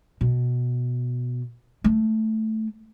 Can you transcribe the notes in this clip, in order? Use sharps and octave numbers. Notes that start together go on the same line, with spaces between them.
B2
A3